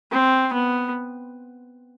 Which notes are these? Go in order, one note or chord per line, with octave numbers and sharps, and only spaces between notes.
C4
B3